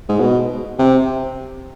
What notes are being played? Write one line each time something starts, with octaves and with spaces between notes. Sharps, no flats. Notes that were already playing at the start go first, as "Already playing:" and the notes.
G#2
B2
C3